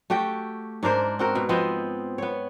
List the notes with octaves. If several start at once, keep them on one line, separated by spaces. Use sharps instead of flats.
A3 F#4 G4 G5
G#2 D4 A#4 C5
C4 F#4 A#4
B2
F3 B3 C4 D#5
B3 C#5